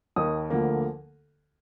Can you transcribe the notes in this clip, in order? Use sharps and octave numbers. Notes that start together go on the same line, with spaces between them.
D#2 D#3 A#3 D#6
D2 D3 F3 A#3